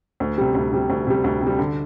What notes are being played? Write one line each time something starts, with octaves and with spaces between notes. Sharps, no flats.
D2
C3 G3
D2
C3 G3
D2
C3 G3
D2
C3
G3
D3